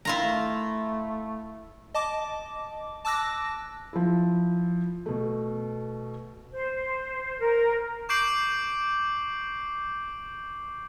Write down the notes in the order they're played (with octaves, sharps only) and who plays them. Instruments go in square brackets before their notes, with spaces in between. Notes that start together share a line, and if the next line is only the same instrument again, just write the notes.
[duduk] D#3 [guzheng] E4 F4 A#5
[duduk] A3
[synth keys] D#5 A5 D6
A5 D6 E6 F#6 A#6
[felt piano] F3 E4
B2 A3
[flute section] C5
A#4
[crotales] C#6 D6 G6 C7 D7 F#7